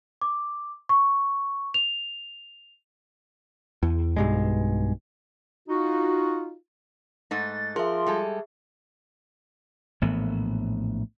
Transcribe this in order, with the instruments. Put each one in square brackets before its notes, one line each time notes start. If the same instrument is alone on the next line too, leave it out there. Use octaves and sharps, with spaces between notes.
[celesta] D6
C#6
F7
[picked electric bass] E2
B1 G2 G#3
[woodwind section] D#4 F4 F#4
[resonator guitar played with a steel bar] G#2 A3 D#4 [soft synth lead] A6
[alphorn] F3 [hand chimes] G#4 E5 [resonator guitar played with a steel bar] A#4 [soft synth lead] C6
[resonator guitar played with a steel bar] G3 G#3 A4
[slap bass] A#1 A2 E3 B3